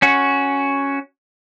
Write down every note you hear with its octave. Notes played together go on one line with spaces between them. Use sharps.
C#4 F#4